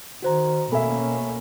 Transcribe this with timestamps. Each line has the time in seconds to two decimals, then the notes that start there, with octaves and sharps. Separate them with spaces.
0.22 D#3 F#4 C5 A#5
0.72 B2 A3 A#3 C#4 A4 E5 G#5 B5